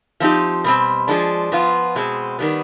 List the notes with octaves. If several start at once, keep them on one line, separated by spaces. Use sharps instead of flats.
F3 C4 D#4 G4
B2 G3 C4
F3 G#3 D4
F3 B3 F4
B2 G#3 C4
D#3 G3 B3